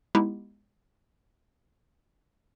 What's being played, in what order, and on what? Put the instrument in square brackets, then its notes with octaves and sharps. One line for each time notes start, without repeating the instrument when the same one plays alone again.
[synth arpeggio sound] G#3 B3 D#4 E4 G4